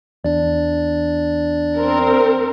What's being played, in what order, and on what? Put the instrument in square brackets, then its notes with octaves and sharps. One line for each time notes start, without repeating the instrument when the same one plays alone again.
[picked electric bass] E2 [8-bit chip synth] D4 D5
[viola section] C4 A#4